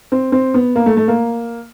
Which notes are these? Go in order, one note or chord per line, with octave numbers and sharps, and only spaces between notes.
C4
C4
B3
A#3
A3
A3
A#3